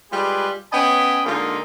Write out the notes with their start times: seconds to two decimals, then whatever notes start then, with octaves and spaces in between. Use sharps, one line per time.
0.12 G3 G#3 F4 G4 G#4 B4
0.72 B3 C#4 D#5 G5 G#5 B5
1.26 D3 G#3 A#3 D#4 F4